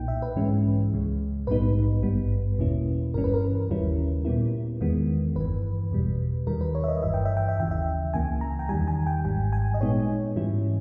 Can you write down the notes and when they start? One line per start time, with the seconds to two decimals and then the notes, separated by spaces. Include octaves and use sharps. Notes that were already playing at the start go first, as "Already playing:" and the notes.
Already playing: B1 A#2 A#3 D#4 G5
0.08 E5
0.22 B4
0.36 G#2 E3 G#3 C#4
0.92 C#2 C#3 G#3
1.47 A#1 G#2 G3 B3 D#4 B4
2.02 G#1 G2 G3 B3
2.59 E2 B2 A#3 C#4 E4
3.14 G1 G2 E3 G3 C#4 A#4
3.24 B4
3.34 A#4
3.69 D#2 C#3 G3 C#4 E4
4.25 A#2 G3 B3 E4
4.81 E2 D#3 G#3 B3
5.36 G1 G2 E3 B4
5.91 E2 B2 G3
6.47 D#2 D#3 G3 A#4
6.61 B4
6.75 C#5
6.84 E5
6.88 D#5
7.02 G1 G2 E3 E5
7.14 G5
7.25 E5
7.37 G5
7.48 E5
7.58 D#2 C#3 E3 G5
7.71 E5
8.14 C#2 C#3 E3 A#3 G#5
8.41 A#5
8.59 G5
8.69 E2 D#3 G3 G#5
8.88 G#5
9.07 G5
9.25 G#1 G#2 G3 G5
9.53 G#5
9.74 D#5
9.80 A#2 G#3 B3 D#4 C#5
10.36 G#2 E3 G3 C#4 E4